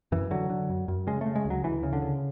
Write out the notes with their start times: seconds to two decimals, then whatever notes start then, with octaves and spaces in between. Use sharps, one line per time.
0.12 F#2 E3
0.31 D3 F#3
0.50 D3
0.70 F#2
0.88 F#2
1.07 C#3 G#3
1.21 A3
1.26 C#3
1.36 G#3
1.45 D2
1.50 F#3
1.64 D2 E3
1.83 C#3
1.93 D3
2.02 C#3